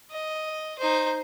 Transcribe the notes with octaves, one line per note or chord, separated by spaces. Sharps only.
D#5
D#4 C5